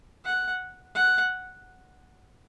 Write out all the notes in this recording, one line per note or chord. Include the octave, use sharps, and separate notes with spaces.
F#5
F#5